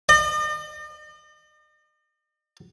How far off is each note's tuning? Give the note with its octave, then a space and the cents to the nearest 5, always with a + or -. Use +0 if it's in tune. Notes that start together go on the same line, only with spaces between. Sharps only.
D#5 -45